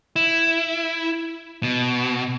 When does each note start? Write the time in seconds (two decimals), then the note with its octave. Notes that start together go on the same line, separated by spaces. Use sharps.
0.16 E4
1.63 B2